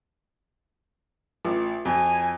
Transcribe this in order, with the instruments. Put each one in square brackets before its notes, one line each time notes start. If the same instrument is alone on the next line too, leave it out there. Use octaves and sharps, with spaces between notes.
[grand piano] A1 [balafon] F4
[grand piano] F2 [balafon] F#4 [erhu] G#5